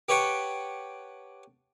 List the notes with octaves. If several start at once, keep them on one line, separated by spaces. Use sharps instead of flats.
G4 B4 C#5 F#5 G5 A5